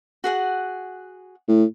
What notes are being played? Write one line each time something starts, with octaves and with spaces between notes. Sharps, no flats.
F#4 G#4 F#5
A2